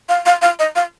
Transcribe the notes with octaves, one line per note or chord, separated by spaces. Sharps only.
F5
F5
F5
D#5
F5